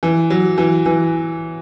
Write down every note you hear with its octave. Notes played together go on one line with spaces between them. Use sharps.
E3
F#3
E3
E3